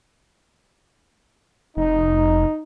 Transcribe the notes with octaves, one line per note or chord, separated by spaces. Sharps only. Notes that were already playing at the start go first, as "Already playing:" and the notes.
F1 D#4